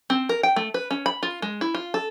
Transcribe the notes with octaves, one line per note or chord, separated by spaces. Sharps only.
C4
A#4
G5
A3
B4
C#4
B5
F4
G#3
E4
F4
A4